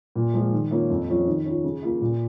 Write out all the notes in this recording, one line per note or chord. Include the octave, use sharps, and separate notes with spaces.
A#2
F3 G#3 F4
D#3
A#3 C#4 F4
F2
F3 C#4 F4
D#3
C#4 F4
C#3
A#3 F4
A#2